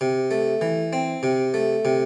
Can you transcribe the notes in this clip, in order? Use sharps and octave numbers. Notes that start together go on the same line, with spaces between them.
C3
A3
E3
C4
C3
A3
C3